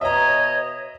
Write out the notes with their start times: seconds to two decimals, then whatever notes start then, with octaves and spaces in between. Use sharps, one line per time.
0.01 B2 C#5 D#5 E5 A#5